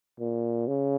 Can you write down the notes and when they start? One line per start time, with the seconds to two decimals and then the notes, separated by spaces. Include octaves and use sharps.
0.20 A#2
0.68 C#3